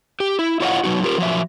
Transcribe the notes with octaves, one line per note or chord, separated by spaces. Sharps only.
G4
E4
E4 F4 C#5 D#5 F5 F#5
F#3 D#4 F#4
F4 G4 A#4
F3 F#3 E5